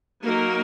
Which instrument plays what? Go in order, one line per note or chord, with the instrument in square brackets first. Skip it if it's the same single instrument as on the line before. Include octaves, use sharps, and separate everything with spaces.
[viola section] F#3 A#3 D#4 A#4